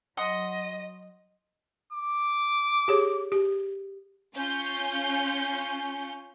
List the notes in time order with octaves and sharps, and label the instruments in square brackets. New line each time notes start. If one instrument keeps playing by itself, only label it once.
[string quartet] F#3 D#5 [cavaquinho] F#5 C6 D#6
[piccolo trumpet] D6
[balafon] G4 G#4 C#5
G4
[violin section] C#4 F4 G6